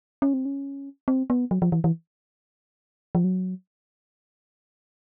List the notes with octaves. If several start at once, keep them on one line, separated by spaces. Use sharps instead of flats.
C#4
C4
C#4
C4
B3
F#3
F3
E3
E3
F3
F#3